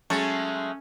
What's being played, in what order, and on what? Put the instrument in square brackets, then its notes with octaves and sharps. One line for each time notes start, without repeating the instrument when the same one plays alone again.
[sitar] F#3 G#3 [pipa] A3 [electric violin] C#4 [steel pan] A5 C#6